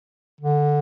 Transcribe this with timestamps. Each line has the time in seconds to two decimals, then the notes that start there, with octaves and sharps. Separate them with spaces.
0.41 D3